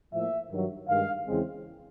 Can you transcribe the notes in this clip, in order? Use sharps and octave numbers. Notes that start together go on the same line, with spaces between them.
A2 F3 A#3 E5
G2 D#3 F#3
G2 D#3 G#3 F5
E2 C#3 E3 G#3 C4